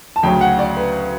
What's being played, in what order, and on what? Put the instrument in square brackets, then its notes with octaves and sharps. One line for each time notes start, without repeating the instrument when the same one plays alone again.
[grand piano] A5
[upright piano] D2 C#3 F#3 C#4 [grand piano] G5
[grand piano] F#5
D5
B4